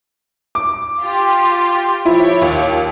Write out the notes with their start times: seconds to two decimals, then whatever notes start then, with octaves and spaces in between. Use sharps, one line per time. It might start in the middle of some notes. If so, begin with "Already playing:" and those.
0.55 D6
1.02 F4 G4
2.05 F3 E4 G4 C#5
2.41 D#2